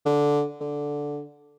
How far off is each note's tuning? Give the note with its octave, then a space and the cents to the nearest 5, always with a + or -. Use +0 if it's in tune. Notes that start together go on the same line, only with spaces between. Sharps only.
D3 -5
D3 -5